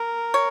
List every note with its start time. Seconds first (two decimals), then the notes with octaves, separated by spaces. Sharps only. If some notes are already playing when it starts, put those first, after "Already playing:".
Already playing: A#4
0.34 C#5